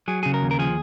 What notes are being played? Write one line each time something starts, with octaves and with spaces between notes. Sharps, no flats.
F#3 G#4
C#3 G#4
A#4
D#2
A#4
F3 G#4